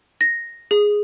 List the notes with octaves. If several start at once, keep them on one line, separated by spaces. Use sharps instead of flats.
A#6
G#4